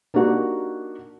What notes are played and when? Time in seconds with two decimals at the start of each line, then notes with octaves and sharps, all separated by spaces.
0.14 A#3 D4 D#4 F#4 G4 A#4